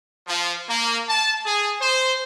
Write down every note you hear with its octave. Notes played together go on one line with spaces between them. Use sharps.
F3
A#3
A5
G#4
C5